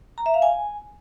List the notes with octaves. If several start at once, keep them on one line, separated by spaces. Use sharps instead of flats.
A#5
E5
F5
G#5